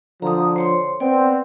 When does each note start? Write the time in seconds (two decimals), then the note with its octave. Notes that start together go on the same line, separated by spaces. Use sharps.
0.22 D3 F3 A#5 D#6
0.56 C5 C#5 C6
1.00 B3 C4 D5